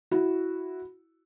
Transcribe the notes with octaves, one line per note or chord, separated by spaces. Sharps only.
E4 F#4